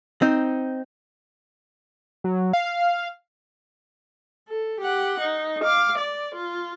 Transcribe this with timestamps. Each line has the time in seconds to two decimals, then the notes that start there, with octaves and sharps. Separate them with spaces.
0.22 C4 D#4
2.24 F#3
2.53 F5
4.49 A4
4.81 G4 F#5
5.20 D#4
5.64 F5 D6
5.98 D5
6.35 F4